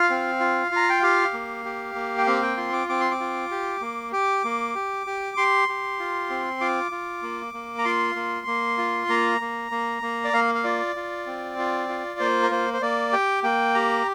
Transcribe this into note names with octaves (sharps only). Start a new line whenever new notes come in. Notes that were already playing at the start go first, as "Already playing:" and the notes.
Already playing: F4 F5
C4
F4
F4 A#5
G5
G4 F5
A#3
G4
A#3
G5
C4 F5
G5
F4 C6
D6
C4 D6
C6
D6
F4
G4
A#3
G4 D6
A#3
G4
G4
G4 C6
G4
F4
C4
F4 D6
F4
A#3
A#3
A#5
F4 C6
A#3
A#3
F4
A#3 A#5
A#3
A#3
A#3
D5
A#3 F5
F5
F4 D5
F4
C4
F4
F4
A#3 C5
A#4
A#3 C5
C5
A#3 D5
G4 G5
A#3 G5
G4 A#5